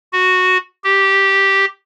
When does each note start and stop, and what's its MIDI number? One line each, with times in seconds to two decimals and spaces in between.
0.13 0.58 66
0.84 1.65 67